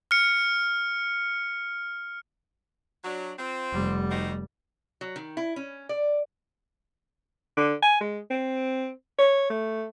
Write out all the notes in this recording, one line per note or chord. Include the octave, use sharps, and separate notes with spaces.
F6 C#7
F#3 D4
C4 F4
F1 G3
C4 D#4 F#4
F#3
D#3
E4
C#4
D5
D3
G#5
G#3
C4
C#5
A3